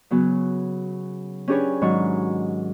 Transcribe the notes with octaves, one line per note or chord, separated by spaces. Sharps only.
C#3 F#3 B3
C#4 D4 G4 G#4 B4 C#5
G#2 D#3 F#3 C#6